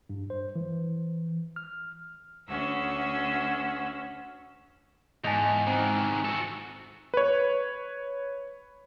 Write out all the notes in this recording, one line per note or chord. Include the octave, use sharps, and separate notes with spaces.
G2
C5
E3
F6
D2 C#4 F#4 E6
E2 G#2 D#5 G#5 A5 F7
D#3 E3 C4
F#4 A4
B4 C#5